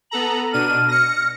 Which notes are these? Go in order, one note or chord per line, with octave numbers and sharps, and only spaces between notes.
B3 A4 A#5 F#7
B2 D4 F6 D#7
A#6 C#7